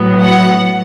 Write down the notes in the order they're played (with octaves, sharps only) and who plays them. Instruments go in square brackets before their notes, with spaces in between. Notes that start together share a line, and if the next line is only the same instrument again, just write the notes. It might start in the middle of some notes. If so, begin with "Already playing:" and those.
Already playing: [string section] A2 F#3 B3
F#5